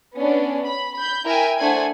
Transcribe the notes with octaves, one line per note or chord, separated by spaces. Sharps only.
B3 C#4 D4
B5
B5 G6
E4 A#4 E5 G5 G#5
A3 D4 C5 F#5 G#5 G#6